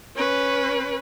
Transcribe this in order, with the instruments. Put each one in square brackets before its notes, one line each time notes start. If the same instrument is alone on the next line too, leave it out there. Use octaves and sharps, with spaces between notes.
[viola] C#4 B4